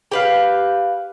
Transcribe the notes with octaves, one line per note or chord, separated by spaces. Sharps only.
G4 B4 F5